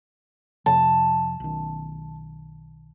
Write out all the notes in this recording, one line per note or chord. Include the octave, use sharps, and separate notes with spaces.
F2 C3 F3 A5
B1 D#3